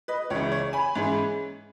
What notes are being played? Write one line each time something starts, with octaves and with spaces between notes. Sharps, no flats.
B4 D#5
C#2 C#3 E3 C#5
C#5
G#5 B5
G#2 E3 G#3 C#4